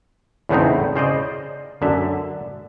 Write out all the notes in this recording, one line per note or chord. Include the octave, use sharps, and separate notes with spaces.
E2 A2 C#3 B3 C4 D#4
C#3 C5 D5 D#5
F#2 D3 E5